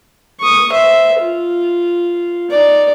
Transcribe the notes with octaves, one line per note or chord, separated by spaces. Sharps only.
C#6 D#6
C5 E5
F4
D#4 D5